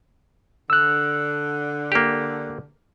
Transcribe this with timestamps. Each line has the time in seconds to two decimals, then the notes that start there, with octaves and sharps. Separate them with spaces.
0.70 D3 E6 F#6
1.92 A#3 G4